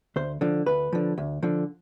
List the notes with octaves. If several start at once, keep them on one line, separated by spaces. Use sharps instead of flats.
D2 C5
D3 F3
D2 B4
D3 F3
D2
D3 F3